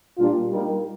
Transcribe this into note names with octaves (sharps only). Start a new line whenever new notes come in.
A#2 G3 D4 F4
G3 A#3 D#4